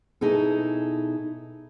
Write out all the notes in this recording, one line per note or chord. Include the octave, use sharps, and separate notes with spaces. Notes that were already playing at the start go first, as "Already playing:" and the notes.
B2 D#4 E4 G#4 A4